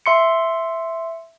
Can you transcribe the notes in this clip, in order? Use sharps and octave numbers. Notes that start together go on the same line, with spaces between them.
E5 C6 C#7